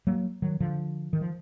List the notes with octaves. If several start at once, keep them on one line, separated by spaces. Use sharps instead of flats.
F#3 A#3
D#3 F#3
D3 F3
D#3
F3